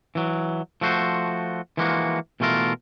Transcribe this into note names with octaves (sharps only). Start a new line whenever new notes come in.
E3 F#3
F3 A3 F#4 C5
E3 F3 G#3 A#3 F#4
B2 E3 A3 F4 A#4